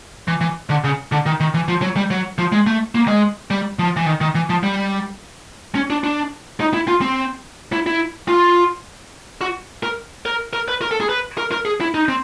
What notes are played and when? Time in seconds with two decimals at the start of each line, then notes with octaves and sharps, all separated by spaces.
0.28 E3
0.41 E3
0.70 D3
0.84 C#3
1.12 D3
1.26 D#3
1.40 D#3
1.54 E3
1.68 F3
1.82 F#3
1.96 G3
2.11 F#3
2.38 F3
2.52 G#3
2.67 A3
2.95 A#3
3.08 G#3
3.50 G3
3.79 F3
3.96 E3
4.06 D#3
4.21 D#3
4.35 E3
4.50 F3
4.63 G3
5.75 C#4
5.90 D4
6.04 D4
6.60 D#4
6.74 E4
6.88 F4
7.01 C4
7.73 E4
7.87 E4
8.28 F4
9.41 F#4
9.83 A#4
10.26 A#4
10.53 A#4
10.68 B4
10.82 A#4
10.91 A4
11.00 G#4
11.09 B4
11.38 A#4
11.52 A#4
11.65 G#4
11.81 E4
11.94 D#4
12.08 C4